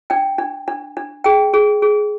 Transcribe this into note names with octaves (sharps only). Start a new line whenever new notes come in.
D4 G5
D4
D4
D4
G#4 G5
G#4
G#4